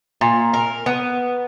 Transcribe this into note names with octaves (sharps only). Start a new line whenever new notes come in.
A#2
A#4
B3